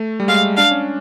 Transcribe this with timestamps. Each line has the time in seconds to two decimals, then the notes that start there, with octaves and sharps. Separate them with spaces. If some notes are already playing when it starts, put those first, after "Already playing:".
Already playing: A3
0.20 G3
0.28 G#3 F5
0.57 D4 F5
0.71 C#4